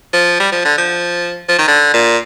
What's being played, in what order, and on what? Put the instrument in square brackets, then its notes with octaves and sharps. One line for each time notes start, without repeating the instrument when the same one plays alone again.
[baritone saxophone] F3
G3
F3
D3
F3
F3
D#3
D3
A#2